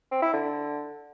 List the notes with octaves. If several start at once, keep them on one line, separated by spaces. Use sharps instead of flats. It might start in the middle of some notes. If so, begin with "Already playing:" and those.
C4
E4
D3